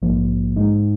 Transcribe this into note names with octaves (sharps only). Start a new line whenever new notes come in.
A#1 G#2 F3 A#3
G#2 G#3 D#4